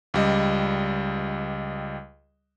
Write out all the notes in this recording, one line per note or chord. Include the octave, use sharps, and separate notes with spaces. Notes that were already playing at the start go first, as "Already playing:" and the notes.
C#2 G3 D#5